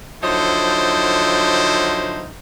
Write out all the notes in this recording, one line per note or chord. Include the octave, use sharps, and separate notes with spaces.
D3 F3 F#3 D#4 E4 C5